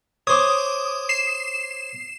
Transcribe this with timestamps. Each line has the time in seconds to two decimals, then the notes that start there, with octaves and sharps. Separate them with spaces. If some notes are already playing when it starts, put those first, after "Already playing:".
0.27 C5 C#5 D6 D#6
1.09 C7 E7